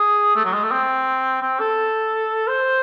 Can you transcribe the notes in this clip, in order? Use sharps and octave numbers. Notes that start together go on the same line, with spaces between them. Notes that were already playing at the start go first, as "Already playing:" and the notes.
Already playing: G#4
A3
F#3
G#3
A3
C4
C4
A4
C5